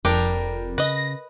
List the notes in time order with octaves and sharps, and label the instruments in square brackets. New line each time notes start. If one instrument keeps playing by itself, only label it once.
[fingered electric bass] F1 [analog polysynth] F2 [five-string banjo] G3 D4 G4 [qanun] A#4
[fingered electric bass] C#3 [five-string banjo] B4 D#5 [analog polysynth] A#6